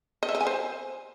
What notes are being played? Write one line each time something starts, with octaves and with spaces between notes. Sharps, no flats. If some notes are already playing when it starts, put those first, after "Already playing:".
D#5
E5
D#5
G#5
C5